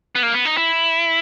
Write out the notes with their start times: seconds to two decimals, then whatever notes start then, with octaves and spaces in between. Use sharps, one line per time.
0.15 B3
0.23 A#3
0.34 B3
0.45 D#4
0.57 E4